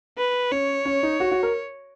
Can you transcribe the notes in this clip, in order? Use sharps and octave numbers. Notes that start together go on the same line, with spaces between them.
B4
C#4 C#5
C#4
D#4
F#4
F#4
A#4